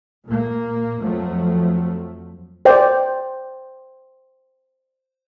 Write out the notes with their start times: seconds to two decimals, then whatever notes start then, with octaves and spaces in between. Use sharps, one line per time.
0.25 A#2 A#3
1.00 F2 F3 F#3 A3
2.65 C5 D5 G5